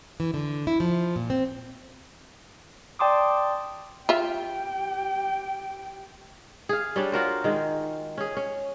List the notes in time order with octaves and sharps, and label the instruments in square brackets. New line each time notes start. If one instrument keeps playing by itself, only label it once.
[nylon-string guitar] E3
D3
E4
F3
A#2
C4
[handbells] D5 G5 A5 C6 D6 D#6
[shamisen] F4 E5 [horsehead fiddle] G4 G5
[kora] G#4 F5
G3 C#4 D4
F4 F#4 A#4 C5
D#3 G#3
C#4 G#4
C#4